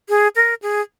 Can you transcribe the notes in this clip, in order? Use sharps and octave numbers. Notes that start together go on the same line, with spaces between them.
G#4
A#4
G#4